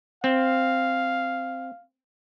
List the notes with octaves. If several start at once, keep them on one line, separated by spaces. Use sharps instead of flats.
C4 F5